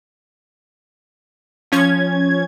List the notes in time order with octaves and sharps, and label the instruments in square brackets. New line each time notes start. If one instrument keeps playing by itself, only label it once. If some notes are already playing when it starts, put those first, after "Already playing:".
[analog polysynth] F3 C#4 G#6